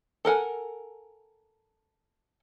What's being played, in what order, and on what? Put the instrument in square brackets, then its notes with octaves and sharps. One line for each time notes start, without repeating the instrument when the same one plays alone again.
[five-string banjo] A4 A#4 F#5 G#5